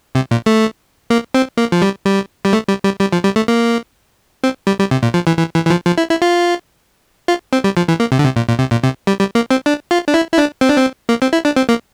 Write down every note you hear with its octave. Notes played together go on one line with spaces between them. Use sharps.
C3
A#2
A3
A#3
C4
A#3
F3
G3
G3
G3
A3
G3
G3
G3
F3
G3
A3
A#3
C4
G3
G3
C3
A#2
F3
E3
E3
E3
E3
F3
F3
E4
E4
F4
F4
C4
G3
F3
E3
A#3
C3
D3
C3
A#2
A#2
C3
A#2
C3
G3
G3
A#3
C4
D4
F4
D4
E4
E4
D4
C4
D4
C4
A#3
C4
E4
D4
C4
A#3